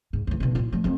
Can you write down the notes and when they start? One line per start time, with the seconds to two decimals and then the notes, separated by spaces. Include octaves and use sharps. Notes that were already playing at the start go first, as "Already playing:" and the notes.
0.13 G#2
0.27 D2 E3
0.40 B2 D#3
0.55 A#2 F4
0.72 F3 A3
0.84 F2 A3